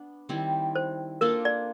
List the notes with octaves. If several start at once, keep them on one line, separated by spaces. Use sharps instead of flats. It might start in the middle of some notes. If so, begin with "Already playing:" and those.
Already playing: B3 D4
D#3 G3 C4 E4
C5
A#3 D4 F4 A4 A#4
D5